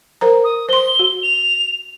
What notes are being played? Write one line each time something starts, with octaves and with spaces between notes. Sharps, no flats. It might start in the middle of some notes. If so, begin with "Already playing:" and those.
A#4 C5 A#5
D#6
C5 C6 G7
F#4
F7